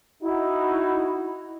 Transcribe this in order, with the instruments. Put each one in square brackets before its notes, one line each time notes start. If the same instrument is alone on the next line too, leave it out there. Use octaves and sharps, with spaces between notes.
[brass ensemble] D#4 F#4 [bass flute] E4